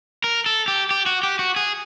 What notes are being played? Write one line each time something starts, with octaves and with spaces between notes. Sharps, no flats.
A#4
A4
G4
G4
F#4
G4
F#4
G#4